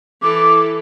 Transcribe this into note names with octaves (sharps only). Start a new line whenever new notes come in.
E3 A4 D6